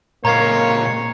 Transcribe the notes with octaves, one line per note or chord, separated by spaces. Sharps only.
A#2 G#3 A#3 C#5 A#5 G#6 C7